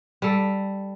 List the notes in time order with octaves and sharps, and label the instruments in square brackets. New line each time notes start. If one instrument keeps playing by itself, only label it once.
[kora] G3 A4